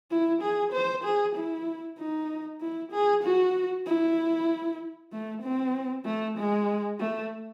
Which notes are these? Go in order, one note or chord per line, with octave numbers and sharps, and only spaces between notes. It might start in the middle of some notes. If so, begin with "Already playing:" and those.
E4
G#4
C5
G#4
E4
D#4
E4
G#4
F#4
E4
A3
C4
A3
G#3
A3